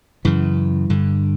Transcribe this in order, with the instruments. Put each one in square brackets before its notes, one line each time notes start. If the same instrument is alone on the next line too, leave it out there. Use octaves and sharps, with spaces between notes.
[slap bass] F#2 C#3 E3
G2 D3